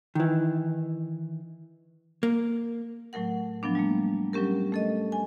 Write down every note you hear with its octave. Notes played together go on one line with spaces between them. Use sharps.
D#3 E3
A#3
A2 F#3 A3 A#4 F#5
F3 F#3 B3 D4
G3 A3 A#3
F#3 G3 C#4 G4 A#4
A3 A4 D#5
G#5